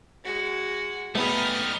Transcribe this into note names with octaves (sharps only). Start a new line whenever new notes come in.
G#3 F#4
G3 A3 B3 D#4 G#4 D#6 F6